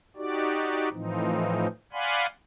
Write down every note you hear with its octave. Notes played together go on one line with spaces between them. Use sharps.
D#4 F#4 G4 D5
A2 E3 F3 C4 D#4
D5 F5 F#5 G#5 B5 C6